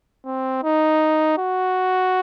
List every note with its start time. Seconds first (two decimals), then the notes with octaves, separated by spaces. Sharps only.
0.25 C4
0.64 D#4
1.38 F#4